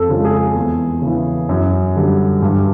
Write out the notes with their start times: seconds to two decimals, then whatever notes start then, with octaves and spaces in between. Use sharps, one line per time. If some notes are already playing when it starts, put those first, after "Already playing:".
Already playing: F2 A4
0.09 C#3 F3 G#3
0.25 G#4
0.55 E2
1.02 C#3 E3
1.49 F#2
1.96 D3 G3
2.42 G2